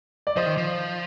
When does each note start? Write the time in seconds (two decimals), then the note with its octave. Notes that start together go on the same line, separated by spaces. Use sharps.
0.27 D5
0.36 F3 C5 D#5
0.46 D#3
0.57 F3